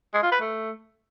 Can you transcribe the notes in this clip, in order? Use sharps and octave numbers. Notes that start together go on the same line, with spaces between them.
G#3
F4
B4
A3